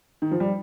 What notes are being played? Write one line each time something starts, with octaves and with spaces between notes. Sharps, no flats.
D#3
F3
G3